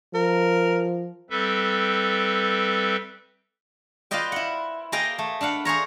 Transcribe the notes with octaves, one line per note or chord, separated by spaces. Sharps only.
F3 A#4
G3 C4 A4 B4 E5
F4 B4 C5 D5 D#5 G5
E4 F#5
A#3 G#4 D#5 G5 A#5
A3
D4 B4 F5 F#5
G#4 C5 C#5 A#5